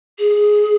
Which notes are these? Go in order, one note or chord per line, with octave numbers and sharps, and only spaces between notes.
G#4